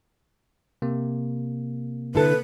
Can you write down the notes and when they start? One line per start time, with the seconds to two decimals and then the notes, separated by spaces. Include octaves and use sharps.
0.82 C3 A#3
2.15 D3 E4 A4 B4